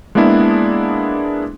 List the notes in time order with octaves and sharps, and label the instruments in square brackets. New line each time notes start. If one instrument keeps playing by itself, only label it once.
[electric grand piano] G#3 A#3 B3 D4 E4 G#4